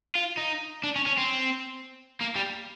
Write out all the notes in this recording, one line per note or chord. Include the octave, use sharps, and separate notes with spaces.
F4
D#4
D4
C#4
C#4
C4
A#3
G3